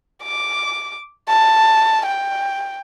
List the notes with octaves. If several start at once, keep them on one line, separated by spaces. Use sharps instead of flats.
D6
A5
G5